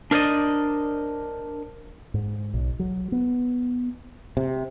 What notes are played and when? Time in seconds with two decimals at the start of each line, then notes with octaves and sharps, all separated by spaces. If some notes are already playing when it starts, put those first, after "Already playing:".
0.11 D4 A#4 C5 D5 D#5
2.14 G#2
2.54 B1
2.79 F#3
3.12 B3
4.37 C3